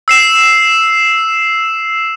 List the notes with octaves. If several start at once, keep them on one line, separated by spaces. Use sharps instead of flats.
E6 C7 E7